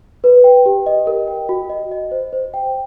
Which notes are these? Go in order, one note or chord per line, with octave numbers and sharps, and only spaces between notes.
B4
G5
G4
D#5
A#4
G5
F#4
D#5
D#5
C5
C5
G5